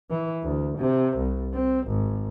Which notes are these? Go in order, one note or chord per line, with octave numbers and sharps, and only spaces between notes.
E3
D2
C3
C2
C4
G#1